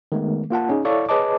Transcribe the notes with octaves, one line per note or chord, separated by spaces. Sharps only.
D#3 G#3 A3 B3
A#3 F4 F#5 A5
C#4 D#4 G#4
E4 A4 C#5 D5 F5 C#6
G#4 B4 C#5 D#5 A5 D6